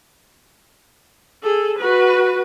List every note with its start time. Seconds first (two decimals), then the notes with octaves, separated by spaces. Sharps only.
1.43 G#4 A4
1.79 F#4 B4